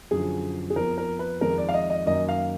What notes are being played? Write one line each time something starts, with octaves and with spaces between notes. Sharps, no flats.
F#2 D3 F3 G#4
G#4
F2 F3 B3 A#4
A#4
B4
F2 D#3 G#3 A#4
D5
F5
D#5
D#5
F#2 D#3 A#3 D#5
F5